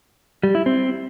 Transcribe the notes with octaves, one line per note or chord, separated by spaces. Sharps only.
G3
E4
C4